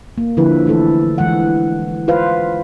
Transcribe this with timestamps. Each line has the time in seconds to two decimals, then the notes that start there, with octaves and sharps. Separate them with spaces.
0.18 A#3
0.37 D3 F3 E4 B4
0.66 E3 A3 E4 A4
1.18 E3 G#3 F#5
2.08 F4 B4 C5 F5